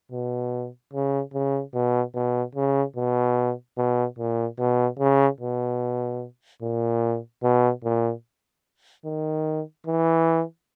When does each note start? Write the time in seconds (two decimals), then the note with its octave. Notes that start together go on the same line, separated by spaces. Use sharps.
0.12 B2
0.93 C#3
1.34 C#3
1.74 B2
2.14 B2
2.55 C#3
2.96 B2
3.77 B2
4.19 A#2
4.59 B2
4.99 C#3
5.40 B2
6.62 A#2
7.43 B2
7.84 A#2
9.05 D#3
9.87 E3